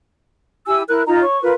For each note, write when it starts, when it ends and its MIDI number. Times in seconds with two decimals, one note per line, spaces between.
0.66 0.82 64
0.66 0.82 67
0.66 0.82 80
0.66 0.82 88
0.88 1.03 64
0.88 1.03 70
0.88 1.03 90
1.07 1.21 63
1.07 1.21 65
1.07 1.21 75
1.07 1.21 82
1.21 1.41 73
1.21 1.41 85
1.42 1.53 65
1.42 1.53 70
1.42 1.53 71